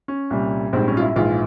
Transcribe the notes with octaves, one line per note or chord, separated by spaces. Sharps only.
C#4
C2 A#2 G3
A#1 G#2 G3 C4
C#4
F4
E4
A#1 G#2 E3 F4